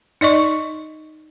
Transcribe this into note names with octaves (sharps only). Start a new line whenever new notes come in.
D#4 D5 D#5 C#6